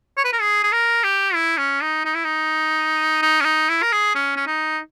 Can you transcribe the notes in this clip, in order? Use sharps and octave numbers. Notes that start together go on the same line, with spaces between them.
C#5
B4
A#4
G#4
G#4
A#4
G4
E4
C#4
D#4
D#4
E4
D#4
D#4
C#4
D#4
E4
A#4
G#4
C#4
C#4
D#4